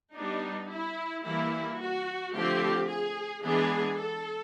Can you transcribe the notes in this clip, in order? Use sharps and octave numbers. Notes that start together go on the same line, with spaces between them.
G3 B3 D4 D#4
E4
E3 G3 A#3 E4
F#4
D3 F3 A3 C4 G4
G#4
E3 G#3 B3 D4 G#4
A4